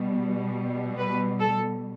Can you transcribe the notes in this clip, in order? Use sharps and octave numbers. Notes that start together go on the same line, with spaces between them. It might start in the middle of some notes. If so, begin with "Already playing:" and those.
Already playing: B2 G3
B4
A4